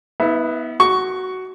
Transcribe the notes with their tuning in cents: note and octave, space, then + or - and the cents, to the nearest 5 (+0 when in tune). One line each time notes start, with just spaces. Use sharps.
B3 +0 E4 -40 E5 +25
F#4 +10 C#6 +10